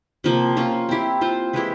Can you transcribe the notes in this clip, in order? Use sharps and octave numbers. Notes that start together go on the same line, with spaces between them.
C3 F3 A#3
A#3 C#4 F4
C4 E4 G4
C4 F4 C5
E3 G#3 E4 G4